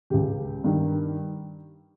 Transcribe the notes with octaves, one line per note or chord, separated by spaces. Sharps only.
C#2 C#3 G4
G2 D#3